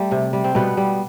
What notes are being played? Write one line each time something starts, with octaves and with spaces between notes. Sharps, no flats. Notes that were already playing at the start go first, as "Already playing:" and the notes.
Already playing: G3 A3
C3
G3
C4
B2 G3 B3
G3